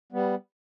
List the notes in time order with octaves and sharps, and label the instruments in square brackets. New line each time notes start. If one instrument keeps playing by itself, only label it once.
[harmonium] G3 B3